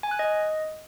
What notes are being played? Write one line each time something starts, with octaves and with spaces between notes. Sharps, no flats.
G#5
F#6
D#5